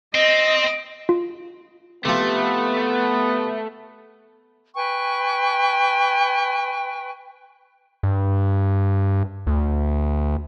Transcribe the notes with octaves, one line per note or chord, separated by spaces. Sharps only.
C4 D#5
F4
C3 F3 A3 B3
B4 G5 G#5 C#6
G2
D2